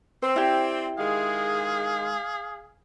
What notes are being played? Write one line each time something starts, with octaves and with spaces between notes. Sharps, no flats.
C4 C5 E6
E4 G4 D5
D#3 G#3 G#4 F5